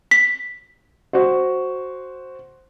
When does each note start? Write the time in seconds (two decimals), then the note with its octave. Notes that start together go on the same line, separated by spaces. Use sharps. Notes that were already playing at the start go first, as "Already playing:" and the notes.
0.11 B6
1.13 F#4 C5